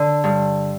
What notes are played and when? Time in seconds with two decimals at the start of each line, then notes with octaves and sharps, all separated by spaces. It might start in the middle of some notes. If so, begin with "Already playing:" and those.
Already playing: D3
0.24 G2